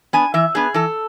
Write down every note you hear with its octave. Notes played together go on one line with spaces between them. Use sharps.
B3 D4 G#5
E3 E5
B3 D4 G#4
E3 A4